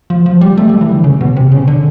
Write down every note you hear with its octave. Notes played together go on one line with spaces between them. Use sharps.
F3
F3
G3
A3
G3
E3
D3
C#3
B2
C3
C#3
D3